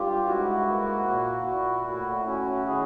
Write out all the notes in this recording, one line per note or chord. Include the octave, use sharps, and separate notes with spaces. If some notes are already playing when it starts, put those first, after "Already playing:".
Already playing: G2 F4 G4
G#2 E4 F#4
A#3
A#2
A#2
A2 E4 F#4
C#4 E4 F#4
D#3 F#4 G#4